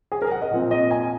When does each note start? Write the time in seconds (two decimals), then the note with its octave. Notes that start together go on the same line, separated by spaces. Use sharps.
0.12 G#4
0.22 A#4
0.31 F#5
0.42 D#5
0.51 A#2 F3 C4
0.71 D#5
0.91 G#5